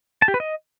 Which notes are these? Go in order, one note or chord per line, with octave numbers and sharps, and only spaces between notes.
A5
G4
B4
D#5